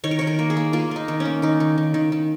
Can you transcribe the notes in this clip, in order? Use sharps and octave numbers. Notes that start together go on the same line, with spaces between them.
D#3 C#5
A#4
D#3 C#5
A#4
A#3
G#4
A#3
A#3 F4
A#3 D#4
D#3
C#4
A#3
D#3 D#4
D#3
D#3
D#3
D#3